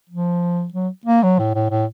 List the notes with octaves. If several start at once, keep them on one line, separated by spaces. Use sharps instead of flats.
F3
F#3
A#3
F#3
A2
A2
A2